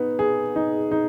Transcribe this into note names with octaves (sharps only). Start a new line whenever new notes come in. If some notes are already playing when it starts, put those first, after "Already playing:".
Already playing: B3 D#4
G#4
D#4
D#4